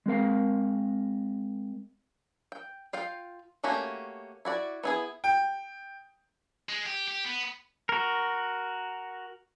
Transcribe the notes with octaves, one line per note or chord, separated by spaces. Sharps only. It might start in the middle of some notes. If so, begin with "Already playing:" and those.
G#3 C4 A#4 F5
G5
F4 F5 G5
A3 A#3 C#4 F#4 G4
E4 F#4 D5
B3 E4 G#4
G5
G#3
G4
G4
B3
F#4 A#4